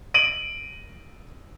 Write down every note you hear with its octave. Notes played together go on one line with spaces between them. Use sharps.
D7 D#7 F#7